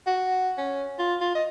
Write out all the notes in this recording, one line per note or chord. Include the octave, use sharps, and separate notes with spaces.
F#4
C#4
F4
F4
D#5